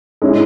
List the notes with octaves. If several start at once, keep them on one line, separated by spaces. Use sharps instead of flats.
G#3 C#4 E4 G#4